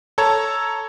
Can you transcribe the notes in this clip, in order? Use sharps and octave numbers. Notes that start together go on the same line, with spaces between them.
A4 C#5 A5 A#5 C#6 G#6